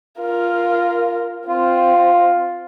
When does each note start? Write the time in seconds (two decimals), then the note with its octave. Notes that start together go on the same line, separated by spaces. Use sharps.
0.19 F4 A#4
1.48 C4 F4